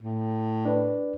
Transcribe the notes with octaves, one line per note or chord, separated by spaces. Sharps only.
A2
D4 B4 D5